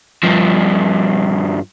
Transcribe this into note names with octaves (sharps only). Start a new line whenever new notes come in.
G2 F3